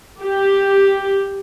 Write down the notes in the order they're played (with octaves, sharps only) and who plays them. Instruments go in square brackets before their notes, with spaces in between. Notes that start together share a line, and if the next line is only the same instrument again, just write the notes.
[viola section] G4